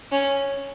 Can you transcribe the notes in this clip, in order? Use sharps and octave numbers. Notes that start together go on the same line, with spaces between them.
C#4